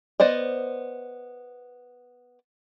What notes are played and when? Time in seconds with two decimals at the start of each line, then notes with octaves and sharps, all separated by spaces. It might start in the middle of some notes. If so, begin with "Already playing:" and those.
0.20 B3 C5 D5 D#5